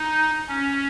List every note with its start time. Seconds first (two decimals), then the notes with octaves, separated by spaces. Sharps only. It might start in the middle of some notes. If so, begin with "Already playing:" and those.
Already playing: D#4
0.49 C#4